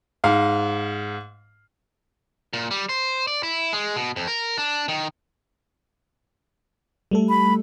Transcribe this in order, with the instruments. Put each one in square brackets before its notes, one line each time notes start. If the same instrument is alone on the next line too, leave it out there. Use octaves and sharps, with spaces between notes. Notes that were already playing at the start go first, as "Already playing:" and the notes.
[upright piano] G#2 F5
[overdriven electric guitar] A#2
G3
C5
D5
E4
G#3
B2
F2
A#4
D4
D#3
[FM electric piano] G3 A3 A4
[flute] B5